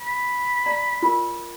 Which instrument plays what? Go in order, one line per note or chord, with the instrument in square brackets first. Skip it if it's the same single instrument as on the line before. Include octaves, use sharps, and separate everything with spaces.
[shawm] B5
[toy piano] D5 A#5
F4 A#4